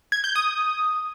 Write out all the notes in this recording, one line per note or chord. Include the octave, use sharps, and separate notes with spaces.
G#6
G6
D#6